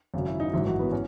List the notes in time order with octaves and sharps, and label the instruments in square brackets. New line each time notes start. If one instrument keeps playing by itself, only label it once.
[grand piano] G#1 F#2 C#3
E4
D#4
A1 G#2 D#3 F#3 E4
F#3 F#4
B3 B4
C#4